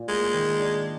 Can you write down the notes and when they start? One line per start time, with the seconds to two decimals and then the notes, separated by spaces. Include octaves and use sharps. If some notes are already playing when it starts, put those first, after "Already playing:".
Already playing: A#2
0.08 G#3 A#3
0.34 D#3
0.60 D4